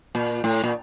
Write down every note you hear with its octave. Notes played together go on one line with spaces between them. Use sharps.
A#2
A2
A#2